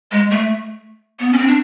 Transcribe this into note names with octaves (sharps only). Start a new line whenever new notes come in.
G#3
A3
B3
C#4
C4
D4